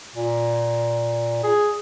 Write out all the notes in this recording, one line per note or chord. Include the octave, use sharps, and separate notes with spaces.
A#2
G#4